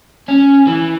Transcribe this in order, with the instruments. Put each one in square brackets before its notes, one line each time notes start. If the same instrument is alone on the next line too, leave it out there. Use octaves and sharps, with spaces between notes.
[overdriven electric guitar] C#4
E3